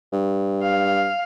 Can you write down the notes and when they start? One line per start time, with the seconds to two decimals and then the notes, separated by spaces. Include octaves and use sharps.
0.12 G2
0.63 F5